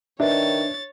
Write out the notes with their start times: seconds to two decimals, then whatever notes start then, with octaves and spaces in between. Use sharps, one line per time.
0.20 D#3 D4 B4 C#5 E5 A6